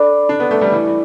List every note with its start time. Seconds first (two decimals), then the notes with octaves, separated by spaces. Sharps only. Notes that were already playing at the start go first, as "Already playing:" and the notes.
Already playing: D4 A4 D5 B5 D6
0.29 D4
0.40 B3
0.51 A3
0.62 G3
0.72 E3